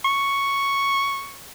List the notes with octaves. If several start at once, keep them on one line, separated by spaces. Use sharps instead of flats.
C#6